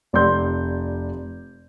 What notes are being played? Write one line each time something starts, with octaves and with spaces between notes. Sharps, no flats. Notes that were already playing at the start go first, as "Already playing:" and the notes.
F1 D5 C6 G6